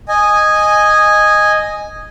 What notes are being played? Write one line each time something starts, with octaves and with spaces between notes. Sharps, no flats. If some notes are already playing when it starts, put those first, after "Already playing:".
D#5 G#5